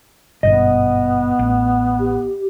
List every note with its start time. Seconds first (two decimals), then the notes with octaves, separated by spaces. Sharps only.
0.43 G#1 G2 B2 B3 D#5
1.39 A1
2.00 G4